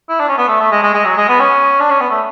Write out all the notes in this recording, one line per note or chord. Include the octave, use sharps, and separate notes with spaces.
E4
D4
C#4
B3
A3
A3
G#3
G#3
G#3
F#3
G#3
B3
C#4
D4
C#4
B3
A3